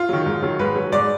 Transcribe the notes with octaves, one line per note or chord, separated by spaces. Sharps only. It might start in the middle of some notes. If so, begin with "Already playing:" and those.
Already playing: F4
D#3 F#3
G#2
D#3 F#3
G#2 B4
F#3
G#2 D5